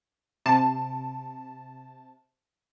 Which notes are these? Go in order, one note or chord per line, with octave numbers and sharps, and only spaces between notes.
C3 A5